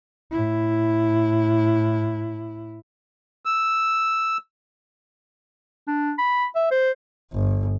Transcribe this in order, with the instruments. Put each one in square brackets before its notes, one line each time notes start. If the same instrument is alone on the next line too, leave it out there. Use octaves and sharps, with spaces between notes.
[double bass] A2 E4
[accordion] E6
[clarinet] D4
B5
E5
C5
[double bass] G1